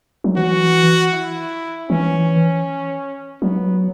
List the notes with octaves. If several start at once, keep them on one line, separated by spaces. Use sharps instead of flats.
F#3
E3 F#4
E4
E3 C#4
F#3 B3